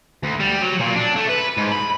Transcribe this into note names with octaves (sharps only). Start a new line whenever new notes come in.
D2
G3
F#3
A#2
D4
A3
B4
G#2
B5